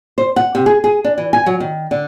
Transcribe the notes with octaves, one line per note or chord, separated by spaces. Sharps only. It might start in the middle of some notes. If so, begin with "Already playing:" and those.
C5
F#5
C3
G#4
G#4
D4
E3
G#5
F#3
D#3
D3